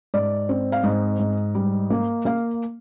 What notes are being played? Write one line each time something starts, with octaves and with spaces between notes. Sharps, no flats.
G#2 D5
C4
F5
G#2 D#5
G#2
G3
A#3
A#3 F5